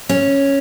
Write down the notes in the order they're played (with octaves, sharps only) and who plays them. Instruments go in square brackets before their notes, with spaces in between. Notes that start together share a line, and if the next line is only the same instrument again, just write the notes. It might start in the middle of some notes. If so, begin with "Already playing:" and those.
[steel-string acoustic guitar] C#4